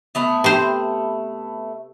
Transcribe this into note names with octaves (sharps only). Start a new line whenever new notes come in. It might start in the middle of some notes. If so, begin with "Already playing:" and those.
A3 B3 E4
C3 C5